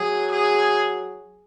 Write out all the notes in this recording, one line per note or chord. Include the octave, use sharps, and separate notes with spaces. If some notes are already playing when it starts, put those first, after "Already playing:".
Already playing: F#3 G#4
G#4